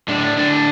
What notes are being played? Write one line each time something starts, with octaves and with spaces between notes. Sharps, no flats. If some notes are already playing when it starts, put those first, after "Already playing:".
A2 D3 D4
A2 D3 D4